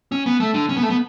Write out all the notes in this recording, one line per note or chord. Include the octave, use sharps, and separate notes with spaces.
C#4
B3
A3
D3
C#4
B3
A3
B3